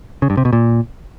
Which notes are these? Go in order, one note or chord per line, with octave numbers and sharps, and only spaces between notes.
C#3
G2
C3
B2
A#2